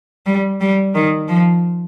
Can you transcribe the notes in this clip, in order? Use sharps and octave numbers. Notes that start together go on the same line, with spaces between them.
G3
G3
D#3
F3